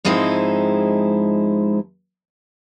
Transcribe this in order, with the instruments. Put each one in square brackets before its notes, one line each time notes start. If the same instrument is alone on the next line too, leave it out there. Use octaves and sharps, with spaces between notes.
[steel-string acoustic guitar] G#2 F3 G#3 C4 D#4 E4